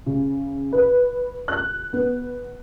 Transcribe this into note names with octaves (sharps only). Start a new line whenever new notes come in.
C#3
B4
F#6
B3